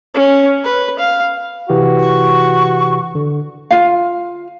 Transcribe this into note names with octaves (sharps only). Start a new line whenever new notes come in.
C#4
B4
F5
C3 E3 F#4 G4
C#6
D3
F4 F5